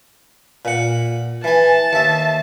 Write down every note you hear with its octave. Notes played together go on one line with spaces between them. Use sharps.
A#2 F#5
E3 G#5 A5
D#2 E5